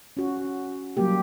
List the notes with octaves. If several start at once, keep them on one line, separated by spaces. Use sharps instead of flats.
C#4 F#4
F#3 G3 A#3 G4